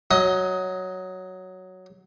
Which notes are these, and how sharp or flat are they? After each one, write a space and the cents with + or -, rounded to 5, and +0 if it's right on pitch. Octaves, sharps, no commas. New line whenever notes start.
F#3 +0 D#5 +20